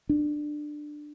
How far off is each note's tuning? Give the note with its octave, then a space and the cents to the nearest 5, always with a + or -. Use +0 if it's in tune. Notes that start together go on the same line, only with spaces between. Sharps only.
D4 +15